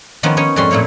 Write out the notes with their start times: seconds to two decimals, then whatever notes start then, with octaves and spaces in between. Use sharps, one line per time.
0.23 D#3 F3 A#3 B3 C#4 D#4
0.37 C#4 D#4 C#5 G#5
0.56 F2 G#2 G3 C#4 F#4 C6
0.71 A#2 A3 A#3 E4 C#5